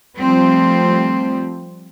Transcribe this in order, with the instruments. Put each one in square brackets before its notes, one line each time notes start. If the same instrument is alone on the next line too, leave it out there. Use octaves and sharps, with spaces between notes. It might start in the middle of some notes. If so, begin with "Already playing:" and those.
[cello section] F3 G3 A3 C4